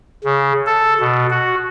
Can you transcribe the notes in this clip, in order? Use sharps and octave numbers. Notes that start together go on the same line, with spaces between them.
C#3
A4
B2
F#4